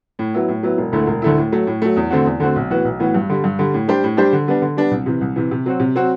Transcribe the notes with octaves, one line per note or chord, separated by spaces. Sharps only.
A2
F#3 B3 E4
A2
F#3 B3 E4
E1
D2 D3 A3 E4
E1
D2 D3 A3 E4
A2
F#3 A3
A2
F#3 A3
E2
D3 A3 C4 F#4
E2
D3 A3 C4 F#4
B1
A2 E3 B3 F#4
B1
A2 E3 B3 F#4
G2
D3 G3
G2
D3 G3
A2
G3 D4 G4 C5
A2
G3 D4 G4 C5
D3
G3 B3 D4
D3
G3 B3 D4
C2
C3 E3
C2
C3 E3
C3
F#3 C4 F#4
C3
F#3 C4 F#4